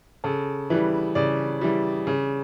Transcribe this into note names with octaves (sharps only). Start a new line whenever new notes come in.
C#3 A4
E3 G3 B4
C#3 D5
E3 G3
C#3